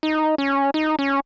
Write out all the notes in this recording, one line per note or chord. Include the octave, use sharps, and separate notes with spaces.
D#4
C#4
D#4
C#4